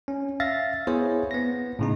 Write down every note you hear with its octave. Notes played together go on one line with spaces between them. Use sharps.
C#4
E5 F5 A6 A#6
B3 E4 G#4 C5 C#5
B3 A#6
A2 C#3 D#4